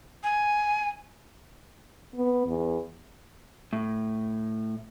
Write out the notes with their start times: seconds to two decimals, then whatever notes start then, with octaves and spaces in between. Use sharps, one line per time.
0.23 G#5
2.16 B3
2.47 E2
3.73 A2